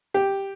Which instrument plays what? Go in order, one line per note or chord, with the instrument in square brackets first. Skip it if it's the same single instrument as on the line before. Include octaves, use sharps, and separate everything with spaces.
[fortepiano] G4